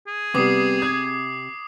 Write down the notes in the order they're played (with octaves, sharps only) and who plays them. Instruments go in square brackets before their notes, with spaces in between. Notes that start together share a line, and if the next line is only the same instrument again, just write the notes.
[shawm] G#4
[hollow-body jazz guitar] C3 [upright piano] G3 B3 [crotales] D6 D#6 C7
[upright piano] G#6